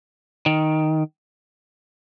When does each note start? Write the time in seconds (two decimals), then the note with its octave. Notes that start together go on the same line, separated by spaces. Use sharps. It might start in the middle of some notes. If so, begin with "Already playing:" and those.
0.46 D#3